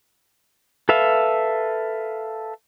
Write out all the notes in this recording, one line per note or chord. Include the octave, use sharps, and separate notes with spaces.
A4 B4 E5 F5